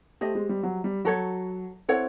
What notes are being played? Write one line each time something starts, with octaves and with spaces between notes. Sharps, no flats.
A3 G4 C5 D#5
G#3
G3
F#3
G3
F#3 F#4 A4 C#5
C4 E4 A4 C#5 F#5